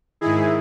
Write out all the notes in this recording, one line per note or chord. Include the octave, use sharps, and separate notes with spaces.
G#2 D#3 E4 G#4